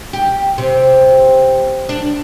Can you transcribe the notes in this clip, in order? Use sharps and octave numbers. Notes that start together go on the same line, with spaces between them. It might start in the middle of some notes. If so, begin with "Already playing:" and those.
G4
C3
D4